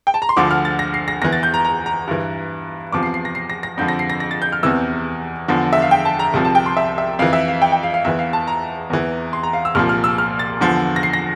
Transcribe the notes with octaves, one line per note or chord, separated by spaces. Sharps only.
G5
A5
A#5
C6
D2 D3 F3 D6
F6
A6
A#6
C7
A#6
E2 E3 A#6
A6
G6
A#5
A#5
A#5
G2 E3
E2 C3 F3 D6
C7
C7
A#6
C7
A#6
A#6
F2 D3 F3 G6
A#6
C7
A#6
A#6
A6
G6
F6
E2 C3 E3 E6
E2 D3 F3
E5
F5
G5
A5
A#5
C2 C3 F3
A5
G5
C6
E5
E5
F2 E3 F5
E5
F5
G5
G5
F5
F5
E2 E3 E5
F5
A5
A#5
E2 E3
C6
A#5
F5
E6
C2 A#2 F3 F6
F6
E6
F6
A6
E2 D3 F3
A#6
C7
A#6